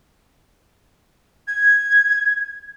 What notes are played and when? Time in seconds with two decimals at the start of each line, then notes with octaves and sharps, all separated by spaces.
1.47 G#6